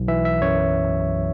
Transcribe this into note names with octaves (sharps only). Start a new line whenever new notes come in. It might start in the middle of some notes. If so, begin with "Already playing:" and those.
Already playing: B1
E3 E5
E5
F#2 C#5